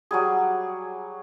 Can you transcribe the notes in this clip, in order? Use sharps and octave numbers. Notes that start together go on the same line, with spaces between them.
F#3 G3 G#4